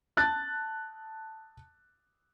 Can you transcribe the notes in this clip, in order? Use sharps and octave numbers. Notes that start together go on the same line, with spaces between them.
A5 F#6 A6